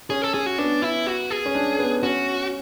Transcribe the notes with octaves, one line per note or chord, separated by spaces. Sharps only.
C#4 G#4
A4
C#4 G#4
F#4
B3 D4
E4
F#4
G#4
C#4
D4
B3
C#4 F#4